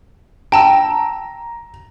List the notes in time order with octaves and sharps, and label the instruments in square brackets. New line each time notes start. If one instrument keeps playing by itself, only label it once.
[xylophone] G5 A5 E6 [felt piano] A#5